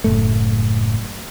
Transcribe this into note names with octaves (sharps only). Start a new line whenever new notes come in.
F#1 A2 A3